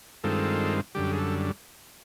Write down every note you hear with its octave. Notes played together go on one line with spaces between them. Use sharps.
G2 D#3 G#3 C4 F4 A4
F#2 D3 G3 G4
G#4
A4